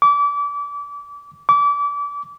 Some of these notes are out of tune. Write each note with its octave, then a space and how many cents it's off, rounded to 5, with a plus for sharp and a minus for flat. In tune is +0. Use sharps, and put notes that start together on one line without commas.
D6 -30
D6 -30